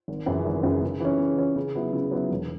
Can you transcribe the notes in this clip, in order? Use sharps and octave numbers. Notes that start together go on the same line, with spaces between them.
G#1
F#2 C#3 E3
G#1
F#2 C#3 E3
C#3
E3 C#4
C#3
E3 C#4
C#3
F#3 B3 E4
C#3
F#3 B3 E4
E1